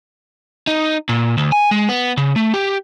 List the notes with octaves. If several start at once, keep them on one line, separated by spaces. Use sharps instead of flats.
D#4
A#2
D2
G#5
G#3
B3
C#3
A3
G4